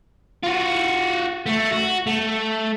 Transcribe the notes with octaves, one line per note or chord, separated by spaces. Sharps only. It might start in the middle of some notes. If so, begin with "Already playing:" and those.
F4 F#4
A3
F#4
A3